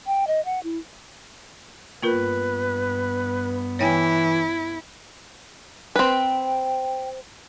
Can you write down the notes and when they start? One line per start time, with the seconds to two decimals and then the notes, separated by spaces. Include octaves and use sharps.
0.06 G5
0.27 D#5
0.45 F#5
0.64 E4
2.02 G2 A#3 B3 F4 A#4 B4
3.79 E3 E4 C#5 G5 G#5
5.96 C4 B4 G5